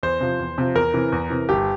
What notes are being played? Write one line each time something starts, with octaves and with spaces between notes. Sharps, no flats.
E2 C5
C3 F3
E2
C3 F3
E2 A#4
C3 E3
E2
C3 E3
G1 G4